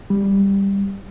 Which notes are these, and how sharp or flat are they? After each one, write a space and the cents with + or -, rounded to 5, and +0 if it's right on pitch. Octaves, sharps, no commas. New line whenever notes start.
G3 +10